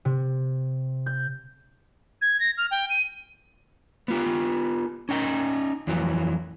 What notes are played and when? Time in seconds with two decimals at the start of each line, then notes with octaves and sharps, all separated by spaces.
0.05 C3
1.06 G6
2.22 G#6
2.40 A#6
2.58 F6
2.71 G5
2.90 D#7
4.08 B3 F4 G4
5.09 C#4 D#4 G5
5.87 F2 E3 F#3